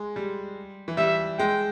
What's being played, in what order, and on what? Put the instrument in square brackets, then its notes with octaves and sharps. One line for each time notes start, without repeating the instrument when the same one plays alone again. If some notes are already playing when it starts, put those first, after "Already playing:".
Already playing: [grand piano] G#3
G3
E3
[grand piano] G3 [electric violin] E5
[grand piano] G#3 [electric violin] G5